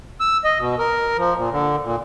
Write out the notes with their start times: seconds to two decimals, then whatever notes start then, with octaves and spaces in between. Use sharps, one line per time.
0.20 E6
0.44 D#5
0.59 B2
0.79 A#4
1.18 F3
1.36 A#2
1.52 D3
1.84 A#2